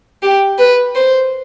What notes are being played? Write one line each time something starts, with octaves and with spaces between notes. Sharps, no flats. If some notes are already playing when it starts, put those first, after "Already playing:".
G4
B4
C5